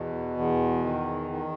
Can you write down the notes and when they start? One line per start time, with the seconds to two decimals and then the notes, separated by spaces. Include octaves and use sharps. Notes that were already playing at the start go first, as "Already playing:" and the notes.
Already playing: E2 B2
0.38 E2
0.84 D#3
1.31 D#3